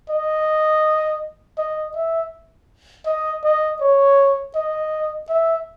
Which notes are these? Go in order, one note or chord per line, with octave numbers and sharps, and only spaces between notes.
D#5
D#5
E5
D#5
D#5
C#5
D#5
E5